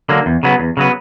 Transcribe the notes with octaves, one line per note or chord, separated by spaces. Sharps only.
D3 F#3 A#3
E2
C#3 F#3 B3
E2
C#3 F#3 B3